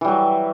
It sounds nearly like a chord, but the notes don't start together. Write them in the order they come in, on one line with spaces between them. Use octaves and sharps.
E3 G3 F#3